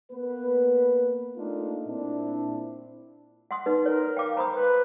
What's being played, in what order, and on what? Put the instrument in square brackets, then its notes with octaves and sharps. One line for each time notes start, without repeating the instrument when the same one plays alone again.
[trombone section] A#3 B3 B4
A3 A#3 D4 D#4 F4
A#2 C4 D4 E4
[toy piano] F#5 C6 D#6
D#4 B4
[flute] A#4 [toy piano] C#5
[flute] F5 [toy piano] G5 D6
[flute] C5 [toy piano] A#5 B5 D#6
[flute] B4